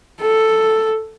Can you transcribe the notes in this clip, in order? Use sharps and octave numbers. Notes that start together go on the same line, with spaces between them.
A4